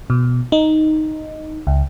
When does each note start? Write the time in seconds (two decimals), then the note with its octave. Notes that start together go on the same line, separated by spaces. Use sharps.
0.10 B2
0.52 D#4
1.67 C#2